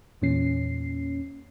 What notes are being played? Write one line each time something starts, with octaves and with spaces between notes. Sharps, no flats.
E2 A#2 C#4 C7